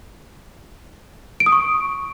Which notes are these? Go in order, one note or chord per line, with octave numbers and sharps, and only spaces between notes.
D7
D#6
C#6